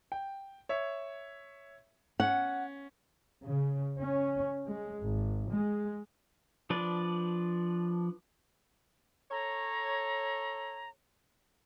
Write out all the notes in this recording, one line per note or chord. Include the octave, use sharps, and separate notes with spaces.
G5
C#5 E5
C#4 F#5
C#3
C#4
G#3
G#1
G#3
F3 D4 B4 D5
A4 C#5 A#5